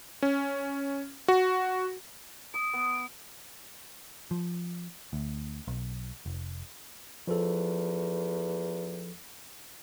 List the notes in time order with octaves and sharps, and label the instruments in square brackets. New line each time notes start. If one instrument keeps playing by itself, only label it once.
[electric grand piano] C#4
F#4
[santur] D#6 [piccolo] D7
[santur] B3
[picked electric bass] F3
D2
B1
F1
[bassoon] E2 [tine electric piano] F3 A4